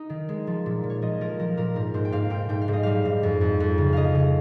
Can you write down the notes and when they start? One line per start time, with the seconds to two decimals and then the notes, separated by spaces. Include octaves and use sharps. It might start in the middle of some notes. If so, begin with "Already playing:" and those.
Already playing: D#4
0.10 D#3
0.29 G#3
0.47 F3
0.66 A#2
0.83 A#2
0.90 C#5
1.02 F3 D#5
1.21 F3 A#4
1.39 F3 A#4
1.57 A#2 A#4
1.75 G#2 A#4
1.94 G#2 C5
2.05 G5
2.12 G#2 F5
2.30 G#2 G5
2.49 G#2 G5
2.62 F5
2.68 G#2 D#5
2.83 G3 F5
3.05 G#2
3.23 F2
3.41 F2
3.60 F2
3.78 C#3
3.93 C#3 D#5 F5
4.15 C#3